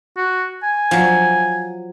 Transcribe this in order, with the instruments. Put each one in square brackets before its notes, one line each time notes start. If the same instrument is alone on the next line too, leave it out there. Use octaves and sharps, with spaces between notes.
[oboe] F#4
G#5
[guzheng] F3 F#3